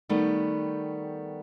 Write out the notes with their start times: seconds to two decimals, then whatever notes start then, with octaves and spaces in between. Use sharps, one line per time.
0.09 D#3 G3 A3 B3